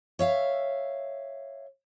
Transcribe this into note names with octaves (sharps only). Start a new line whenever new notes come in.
C#5 E5 F5